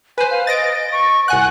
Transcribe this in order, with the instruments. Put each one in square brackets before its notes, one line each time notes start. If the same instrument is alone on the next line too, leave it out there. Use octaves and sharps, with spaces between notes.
[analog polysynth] B4 C5 [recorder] G#5
[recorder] F5
[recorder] D#5 [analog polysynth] A6 A#6 D7
[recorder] C#6
[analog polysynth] C2 G#5 F#6 [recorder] F#5